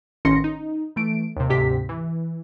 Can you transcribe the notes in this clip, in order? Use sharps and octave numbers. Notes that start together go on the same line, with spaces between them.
A1 D#3 C#4 C6 A#6 C#7
D#4
E3 A3 D7
D#2 C3
D2 G#2 C3 G4 B6
E3